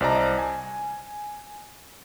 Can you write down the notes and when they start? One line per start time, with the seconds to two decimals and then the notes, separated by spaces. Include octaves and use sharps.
0.01 C2 C5 D5 D#5 A5 A#5
0.38 G#5